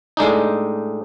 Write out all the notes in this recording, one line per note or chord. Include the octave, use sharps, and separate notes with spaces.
A2 G#3 D4 D#4